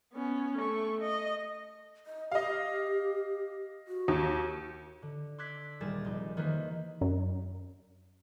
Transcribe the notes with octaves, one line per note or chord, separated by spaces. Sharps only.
B3 C#4
A3 C#6
D#5
D#5
G4 D#5 F5
F#4
D#2
D3
C6 D6 E6 F#6 G#6 B6
D#1 G3 G#4 A#4 A6 E7
F1 D#4
D#3 E3 A#3 B4 C5
F#2 F#3